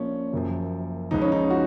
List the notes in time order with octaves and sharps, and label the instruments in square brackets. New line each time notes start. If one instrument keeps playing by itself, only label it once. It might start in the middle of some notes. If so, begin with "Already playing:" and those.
Already playing: [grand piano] A#1 A#2 F3 C#4
F#1 F#2 F3
C#2 C#3 F3 D#4
C#4
D#4
F#4